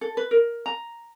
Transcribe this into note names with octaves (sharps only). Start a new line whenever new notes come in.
A4
B4
A#4
A#5